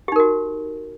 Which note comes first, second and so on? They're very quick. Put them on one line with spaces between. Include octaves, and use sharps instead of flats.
G4 D#4 A#4 F#4